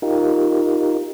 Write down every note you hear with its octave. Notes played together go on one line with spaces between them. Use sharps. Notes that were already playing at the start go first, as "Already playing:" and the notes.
D#4 F4 G4 A#4